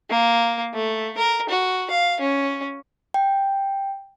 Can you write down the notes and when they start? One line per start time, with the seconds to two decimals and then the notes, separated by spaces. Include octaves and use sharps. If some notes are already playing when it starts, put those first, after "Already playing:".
0.10 A#3
0.74 A3
1.17 A#4
1.49 F#4
1.90 F5
2.20 C#4
3.14 G5